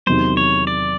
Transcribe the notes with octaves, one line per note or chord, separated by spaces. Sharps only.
E2 C3 D#3 F#3 C5
C#5
D5